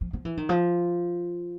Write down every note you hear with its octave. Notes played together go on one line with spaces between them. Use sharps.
F3
F3
E3
D#3
F3